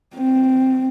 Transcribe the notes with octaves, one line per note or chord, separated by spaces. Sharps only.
C4